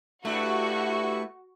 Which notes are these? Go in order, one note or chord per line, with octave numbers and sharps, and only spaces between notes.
G2 A3 D4 E4 F#4 B4 C#6